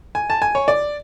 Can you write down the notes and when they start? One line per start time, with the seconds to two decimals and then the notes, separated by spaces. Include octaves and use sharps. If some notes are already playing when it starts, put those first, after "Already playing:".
0.15 G#5
0.30 A5
0.42 G#5
0.55 C#5
0.68 D5